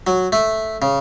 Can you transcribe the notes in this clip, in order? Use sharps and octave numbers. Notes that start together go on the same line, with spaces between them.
F#3
A3
C#3